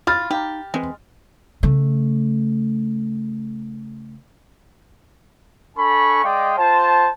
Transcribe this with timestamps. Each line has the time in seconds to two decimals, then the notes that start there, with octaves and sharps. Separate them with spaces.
0.07 F4 B5 F6 A6
0.31 D#4 G4 F5 A#5
0.74 E3 G#3 C4 B4
1.63 C#3 A3
5.77 D4 A4 G#5 B5 C#6
6.23 G#3 D5 D#5 F5 G5
6.57 F4 C5 A5